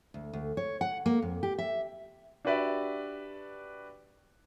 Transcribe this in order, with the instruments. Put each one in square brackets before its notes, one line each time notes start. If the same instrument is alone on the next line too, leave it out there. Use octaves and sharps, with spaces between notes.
[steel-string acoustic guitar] D2
D2
C#5
F#5
A#3
F2
G4
E5
[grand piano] D4 F#4 G4 B4 D5 E5